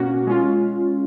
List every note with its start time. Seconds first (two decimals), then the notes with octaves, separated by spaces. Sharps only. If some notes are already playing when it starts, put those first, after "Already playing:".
Already playing: B2 A#3 C#4 F#4
0.27 G#3 C#4 F4